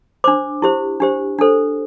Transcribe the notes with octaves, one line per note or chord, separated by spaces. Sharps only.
D4 C5 D6
E4 G4 C5
D4 G4 C5
D4 A4 C5